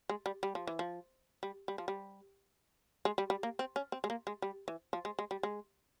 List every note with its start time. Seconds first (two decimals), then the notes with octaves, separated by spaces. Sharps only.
0.09 G#3
0.26 G3
0.43 G3
0.55 F3
0.67 E3
0.79 F3
1.43 G3
1.68 G3
1.78 F3
1.88 G3
3.05 G#3
3.18 G3
3.30 G3
3.43 A#3
3.59 C4
3.76 C#4
3.92 C4
4.04 G#3
4.10 A#3
4.27 G#3
4.42 G3
4.68 E3
4.93 F3
5.05 G#3
5.19 G#3
5.31 G3
5.43 G#3